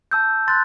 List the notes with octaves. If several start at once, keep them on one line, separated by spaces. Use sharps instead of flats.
A5 E6 G6
C6 F#6 A6